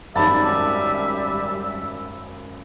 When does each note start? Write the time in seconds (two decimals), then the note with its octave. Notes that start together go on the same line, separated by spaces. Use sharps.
0.16 G#1 F#2 G3 E5 A5 B5